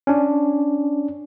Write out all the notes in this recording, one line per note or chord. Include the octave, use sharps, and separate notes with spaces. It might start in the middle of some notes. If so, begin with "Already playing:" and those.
C#4 D4